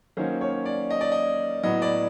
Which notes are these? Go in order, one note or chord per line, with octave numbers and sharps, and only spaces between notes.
D#3 F#3 A#3 C#4 C5
C#5
D5
D#5
D5
D#5
A2 F#3 B3 D#5
D5